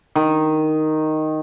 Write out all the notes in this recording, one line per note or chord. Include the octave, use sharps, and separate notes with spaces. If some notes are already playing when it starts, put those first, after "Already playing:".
D#3